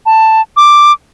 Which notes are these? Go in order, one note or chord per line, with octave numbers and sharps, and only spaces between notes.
A5
D6